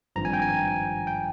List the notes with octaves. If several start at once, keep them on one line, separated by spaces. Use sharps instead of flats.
G#1 G2 F3 A#5
G#5
G5
G#5
G5